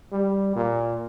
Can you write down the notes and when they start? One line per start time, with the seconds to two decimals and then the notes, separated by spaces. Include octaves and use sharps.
0.12 G3
0.56 A#2